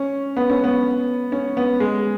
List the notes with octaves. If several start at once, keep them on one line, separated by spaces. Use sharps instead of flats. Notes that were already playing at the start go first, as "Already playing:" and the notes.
Already playing: C#4
B3
C#4
B3
C#4
B3
G#3